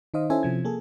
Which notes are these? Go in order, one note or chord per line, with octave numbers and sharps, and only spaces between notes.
D#3 D#4 C5 D#5 F5 D#6
C#4 E4 A4 C5 E5 G#5
C3 F3 G#6
A#3 G#4 A4